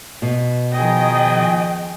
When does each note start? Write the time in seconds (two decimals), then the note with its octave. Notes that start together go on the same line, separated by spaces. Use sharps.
0.22 B2
0.73 D#3 F3 G#4 D#5 G5